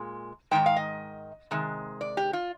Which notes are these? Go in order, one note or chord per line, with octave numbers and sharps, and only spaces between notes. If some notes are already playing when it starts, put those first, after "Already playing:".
Already playing: A#2 G#3
G#2 D#3 G#3 G5
F5
D#5
C3 D#3 G#3
D5
G4
F4